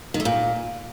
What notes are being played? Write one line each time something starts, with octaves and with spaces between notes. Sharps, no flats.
D#3
A3
A#2